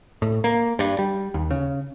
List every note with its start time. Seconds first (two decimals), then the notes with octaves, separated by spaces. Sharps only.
0.22 A2
0.44 A#3
0.79 G2
0.99 G3
1.34 D#2
1.51 C#3